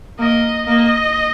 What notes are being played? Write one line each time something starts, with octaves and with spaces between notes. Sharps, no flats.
A#3 D#5
A#3 D#5